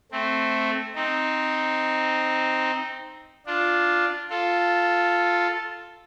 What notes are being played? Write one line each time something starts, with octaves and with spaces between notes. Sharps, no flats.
A3 C4
C4 D#4
D4 F4
F4 A4